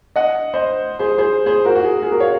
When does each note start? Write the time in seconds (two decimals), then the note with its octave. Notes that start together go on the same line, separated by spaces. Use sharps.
0.16 D#5 F#5
0.54 C5 D#5
0.99 G#4 C5
1.18 G#4 C5
1.46 G#4 C5
1.65 F#4 A#4
1.76 F#4
1.84 G#4
2.03 G#4
2.12 F#4 A#4
2.20 C#5 F5